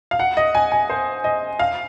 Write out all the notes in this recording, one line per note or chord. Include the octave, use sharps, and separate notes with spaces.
F5
F#5
D#5
G#5
G#5
C5
D#5
F5